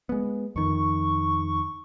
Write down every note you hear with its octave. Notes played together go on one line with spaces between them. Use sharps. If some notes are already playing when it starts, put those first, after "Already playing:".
G#3 B3
F2 D#3 C#6